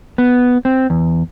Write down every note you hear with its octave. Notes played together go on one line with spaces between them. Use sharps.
B3
C4
E2